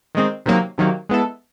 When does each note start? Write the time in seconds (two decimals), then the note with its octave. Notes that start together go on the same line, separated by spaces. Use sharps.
0.15 D#3 G#3 C4
0.46 C3 D#3 F#3 A#3
0.78 C3 D#3 F#3 A#3
1.09 G#3 B3 E4 A4